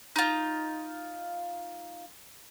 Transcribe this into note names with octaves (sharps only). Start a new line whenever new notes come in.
D#4 F4